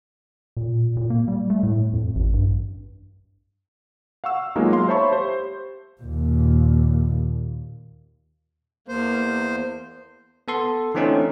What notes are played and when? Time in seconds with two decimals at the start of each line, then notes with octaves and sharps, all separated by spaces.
0.57 A#2
0.97 A#2
1.10 A#3
1.28 G3
1.50 A3
1.63 A2
1.93 F2
2.15 A1
2.33 G2
4.24 F5 F#5 C#6 E6
4.55 F#3 G#3 A#3 B3 D#4 F4
4.73 F5 C6
4.88 C5 C#5 E5 A5 B5 C#6
5.11 G4 C5
6.02 D#2 A#2
8.89 E2 A#3 C5
10.48 B3 A4 C6
10.95 D3 E3 A3 C4 C#4 D#4